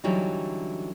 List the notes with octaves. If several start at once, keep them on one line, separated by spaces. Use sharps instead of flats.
D3 E3 F#3 G3 C#4 D#4